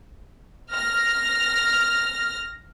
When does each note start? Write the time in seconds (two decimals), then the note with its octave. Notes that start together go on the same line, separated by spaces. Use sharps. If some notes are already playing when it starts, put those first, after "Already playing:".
0.71 F6 A#6